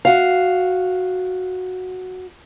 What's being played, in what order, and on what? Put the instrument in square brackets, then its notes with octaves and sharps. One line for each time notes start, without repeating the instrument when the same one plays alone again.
[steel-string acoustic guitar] F#4 F5